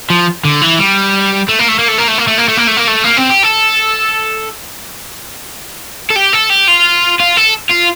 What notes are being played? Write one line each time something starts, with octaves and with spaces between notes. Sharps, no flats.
F3
D3
E3
G3
A3
A#3
A3
A#3
A3
A#3
A3
A#3
A3
A#3
A3
A#3
A3
A#3
A3
A#3
C4
G4
A4
A4
G4
A4
G4
F4
F4
A4
F4